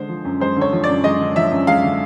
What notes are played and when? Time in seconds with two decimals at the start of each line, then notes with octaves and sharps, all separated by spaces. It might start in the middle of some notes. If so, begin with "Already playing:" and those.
Already playing: D3 G#3 C5
0.09 F3
0.25 F#2
0.40 G#3 C5
0.56 D3
0.61 C#5
0.72 F3
0.84 F#2 D5
1.04 G#3 D#5
1.20 D3
1.36 F3 E5
1.51 F#2
1.67 G#3 F5
1.83 D3